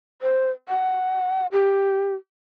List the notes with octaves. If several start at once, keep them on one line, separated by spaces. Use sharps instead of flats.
C5
F#5
G4